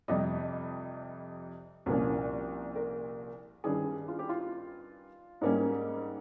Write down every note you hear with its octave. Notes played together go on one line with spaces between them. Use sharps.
F2 C3 G3 D#5
C2 A#2 F3 A#3 C#4
A#4
G2 D#3 G3 C#4 G#4
F4
G4
F4
G#2 G3 A#3 C#4